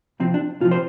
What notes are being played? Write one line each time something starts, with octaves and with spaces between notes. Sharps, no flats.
C3 F3 C4
D4
C3 F3 F4
C5